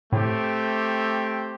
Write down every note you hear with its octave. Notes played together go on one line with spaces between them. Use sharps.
A2 A3 C4 G4